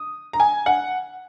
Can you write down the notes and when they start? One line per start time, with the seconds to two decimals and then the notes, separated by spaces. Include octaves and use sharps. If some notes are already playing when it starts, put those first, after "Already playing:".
Already playing: D#6
0.33 A#5
0.40 G#5
0.66 F#5